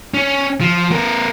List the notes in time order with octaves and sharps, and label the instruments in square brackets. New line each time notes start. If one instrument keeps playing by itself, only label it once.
[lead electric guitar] C#4
F3
B3 A#4